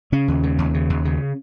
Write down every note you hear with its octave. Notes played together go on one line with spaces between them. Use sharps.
C#3 C#4
D#2
C#3
D#2
C#3
D#2
C#3